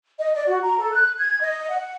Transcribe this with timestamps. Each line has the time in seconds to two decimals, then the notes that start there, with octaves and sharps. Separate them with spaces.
0.19 D#5
0.34 D5
0.47 F#4
0.63 A#5
0.79 A4
0.93 F#6
1.18 G#6
1.41 D#5
1.70 F#5